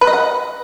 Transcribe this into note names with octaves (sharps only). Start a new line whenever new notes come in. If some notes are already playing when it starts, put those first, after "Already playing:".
B4
D#5
F#5